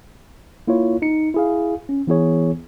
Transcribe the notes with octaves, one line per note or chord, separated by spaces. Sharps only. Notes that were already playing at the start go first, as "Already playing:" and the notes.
A#3 E4 F4 C#5
D#4 C#7
E4 G#4 F5
C#4
E3 B3 E4 G#4 C#5